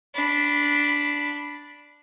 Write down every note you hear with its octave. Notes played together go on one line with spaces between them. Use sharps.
D4 B5